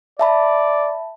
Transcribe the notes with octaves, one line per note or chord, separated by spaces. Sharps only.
D5 E5 A5 B5